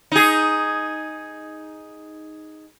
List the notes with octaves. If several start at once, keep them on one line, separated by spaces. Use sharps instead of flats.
D#4 G#4